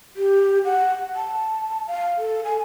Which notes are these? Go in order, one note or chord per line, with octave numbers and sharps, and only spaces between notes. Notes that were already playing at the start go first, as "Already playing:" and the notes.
G4
F#5
A5
F5
A4
G#5